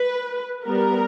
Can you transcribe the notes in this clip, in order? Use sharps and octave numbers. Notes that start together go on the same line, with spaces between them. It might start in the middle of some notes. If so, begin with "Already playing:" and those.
Already playing: B4
G3 B3 A#4